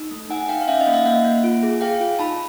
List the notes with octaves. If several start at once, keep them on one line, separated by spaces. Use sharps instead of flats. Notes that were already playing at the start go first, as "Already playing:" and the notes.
Already playing: D#4
A3
D#4 F#5 G#5
D#4 F5 G5
F5
C#4 E5 F#5
D#5 F5
A#3
E5 F#5
A#3 E5 F#5
A#3
F4
G#4
G#4 F5 G5
F4
D#4 A5 B5